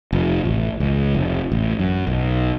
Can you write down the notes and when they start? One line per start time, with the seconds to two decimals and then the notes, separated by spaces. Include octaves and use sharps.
0.13 F1
0.45 A1
0.80 C#2
1.15 F1
1.52 A1
1.79 F#2
2.07 B1